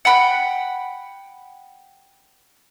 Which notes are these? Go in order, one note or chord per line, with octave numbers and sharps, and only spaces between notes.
F#5 G5 B5 F#6